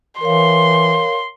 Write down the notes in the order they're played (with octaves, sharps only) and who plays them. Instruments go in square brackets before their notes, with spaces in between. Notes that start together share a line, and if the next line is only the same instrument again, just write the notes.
[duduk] E3 [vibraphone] A#4 C#5 F5 [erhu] C6